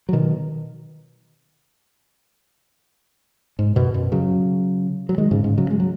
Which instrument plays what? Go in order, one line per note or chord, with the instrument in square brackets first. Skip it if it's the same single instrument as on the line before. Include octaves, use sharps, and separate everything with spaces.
[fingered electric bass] F#3
B2 D#3
G#2
F#2 B2
F#2 B2
C#3 F#3
F#3
D#3 G#3
G#2 C#3
G#2 C#3
C#3 F#3
G#3
F#3